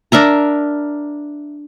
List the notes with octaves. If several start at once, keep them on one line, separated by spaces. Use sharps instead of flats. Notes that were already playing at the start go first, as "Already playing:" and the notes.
D4 A#4 E5 A#5